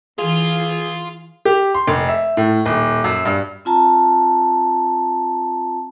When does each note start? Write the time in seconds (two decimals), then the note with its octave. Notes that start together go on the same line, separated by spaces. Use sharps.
0.18 E3 F4 G#4
1.45 G4
1.74 C6
1.88 F1
2.09 E5
2.37 A2
2.66 D#1
3.04 F#2
3.25 G2
3.65 C4 F4 A5 A#5